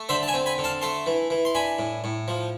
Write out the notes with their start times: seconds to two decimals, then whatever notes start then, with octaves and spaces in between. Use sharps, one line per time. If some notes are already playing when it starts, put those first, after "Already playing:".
Already playing: A3
0.09 D3 C5 E5
0.23 A5
0.28 E5 G#5
0.34 C4
0.46 G#5 B5
0.58 D3
0.64 F5 A5
0.82 A3 A5 C6
1.06 E3
1.30 E3
1.45 C6
1.55 D4 G#5 B5
1.79 A2
2.04 A2
2.28 F3